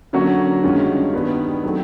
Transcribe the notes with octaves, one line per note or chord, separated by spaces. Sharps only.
D3 F#3 A#3 C#4 F#4
G2 D#3 G#3 C#4 F4
G2 D#3 G3 B3
F#3 A3 C4